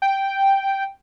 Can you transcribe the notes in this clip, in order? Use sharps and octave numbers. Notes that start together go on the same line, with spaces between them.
G5